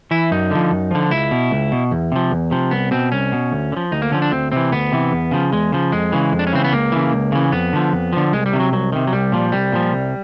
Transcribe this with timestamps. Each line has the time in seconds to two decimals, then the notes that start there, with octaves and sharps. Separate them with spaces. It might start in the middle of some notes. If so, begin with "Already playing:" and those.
0.11 E3 E4
0.31 F#2 D#4
0.51 D3 F3
0.71 F#2
0.91 D3 F3
1.11 C#2 E4
1.31 B2
1.51 C#2
1.72 B2
1.92 E2
2.12 C3 F3
2.31 E2
2.51 C3 F3
2.71 C2 B3
2.91 B2 C4
3.12 C2 C#4
3.32 B2
3.52 D2
3.72 D3
3.77 F3
3.92 D2 D#4
4.02 A#3
4.11 D3 F3 C#4
4.22 D4
4.32 D2 C4
4.52 C3 E3 C4
4.72 D2 B3
4.92 C3 E3
5.12 E2
5.31 C#3 F3
5.52 E2 G#3
5.72 C#3 F3
5.92 F2 G#3
6.12 C#3 E3
6.32 F2
6.39 D4
6.47 C#4
6.53 C#3 E3 C4
6.64 B3
6.72 C#2 A#3
6.92 C#3 E3
7.13 C#2
7.32 C#3 E3
7.52 F2 B3
7.73 D3 F3
7.92 F2
8.13 D3 F3
8.33 C2 G#3
8.46 G3
8.53 C3 D#3
8.60 F#3
8.72 C2 F#3
8.92 C3 D#3
9.07 F#3
9.13 C2 G3
9.32 A#2 F3
9.52 C2 G3
9.72 A#2 F3
9.93 C2